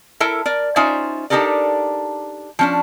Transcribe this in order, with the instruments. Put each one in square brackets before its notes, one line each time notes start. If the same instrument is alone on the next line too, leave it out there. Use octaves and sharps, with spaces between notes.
[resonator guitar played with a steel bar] E4 A4 A#4 E5
A#4 D5
C#4 D#4 F4 C5 D5 E5
D4 D#4 G4 A4 A#4 D5
F3 C#4 D4